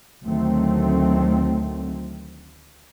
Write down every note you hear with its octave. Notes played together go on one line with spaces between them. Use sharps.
D2 D#3 F#3 A3 C4